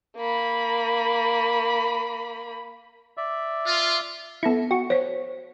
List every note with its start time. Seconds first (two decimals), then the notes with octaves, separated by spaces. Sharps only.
0.17 A#3 B5
3.17 D5 E5
3.66 F4
4.43 B3 E4 A4 A#6 C#7
4.71 F#4 G5 C#6
4.90 C5 C#5 B6